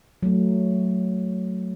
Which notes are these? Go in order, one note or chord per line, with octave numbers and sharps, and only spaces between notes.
F#3 A3